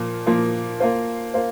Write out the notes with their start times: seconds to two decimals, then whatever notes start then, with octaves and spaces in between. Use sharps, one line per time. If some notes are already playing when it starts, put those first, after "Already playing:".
Already playing: A#2 F3 A#3
0.27 A#2 F3 A#3
0.80 A#3 F4 C5
1.34 A#3 F4 C5